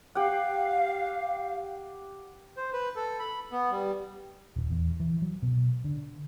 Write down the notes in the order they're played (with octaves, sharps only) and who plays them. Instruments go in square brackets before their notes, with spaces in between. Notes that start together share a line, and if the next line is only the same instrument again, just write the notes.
[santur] G4 F#5 [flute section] F5
[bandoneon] C5
B4
A4
B5
B3
G3
[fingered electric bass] D#1
E2
E3
F#3
B2
D3